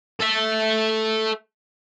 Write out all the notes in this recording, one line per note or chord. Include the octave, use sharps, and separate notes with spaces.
A4 E5